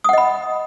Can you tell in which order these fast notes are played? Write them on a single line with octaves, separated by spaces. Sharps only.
D#6 F#5 D#5 B5